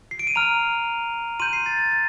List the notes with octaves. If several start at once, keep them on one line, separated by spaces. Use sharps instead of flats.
C7
D7
D#7
A#5 F6 F7
C6 G6 D#7
C7
A6
A6
A6